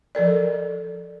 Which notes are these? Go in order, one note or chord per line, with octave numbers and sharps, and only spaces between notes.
F3 A4 A#4 D5